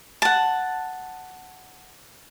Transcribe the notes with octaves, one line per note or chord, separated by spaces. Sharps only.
F#5 A5